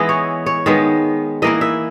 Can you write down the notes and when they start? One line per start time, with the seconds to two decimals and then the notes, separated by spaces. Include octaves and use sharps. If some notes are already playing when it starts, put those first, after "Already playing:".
Already playing: E3 G#3 B3 E4 D#5
0.09 C#5
0.46 C#5
0.66 D#3 G#3 B3
1.42 E3 A#3 E4 D#5
1.61 E5